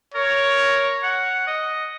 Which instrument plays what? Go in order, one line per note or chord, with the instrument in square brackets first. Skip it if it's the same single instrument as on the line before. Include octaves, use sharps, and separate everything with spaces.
[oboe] A#4 [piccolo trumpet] C#5
[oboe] F#5
D#5